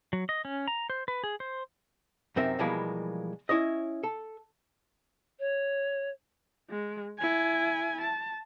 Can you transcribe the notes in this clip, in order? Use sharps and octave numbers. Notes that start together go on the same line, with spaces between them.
F#3
D#5
C#4
A#5
C5
B4
G#4
C5
F#2 C3 C4 D#4 A#4 E5
B2 E3 F3 G3 G#3 A#3
C#4 E4 C#5 D#5
A4
C#5
G#3
E4 G#5
A5